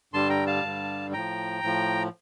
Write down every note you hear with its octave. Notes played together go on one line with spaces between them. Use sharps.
G2 D3 G3 A5 C6
G5 A#5
F5 A5
G2 D3 G3
A2 F3 G5 A#5
A2 F3